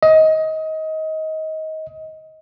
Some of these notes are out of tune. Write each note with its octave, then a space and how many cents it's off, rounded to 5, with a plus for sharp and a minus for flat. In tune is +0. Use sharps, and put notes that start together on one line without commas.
D#5 +20